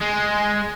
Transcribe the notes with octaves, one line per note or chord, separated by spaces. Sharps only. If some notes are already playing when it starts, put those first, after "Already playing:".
G#3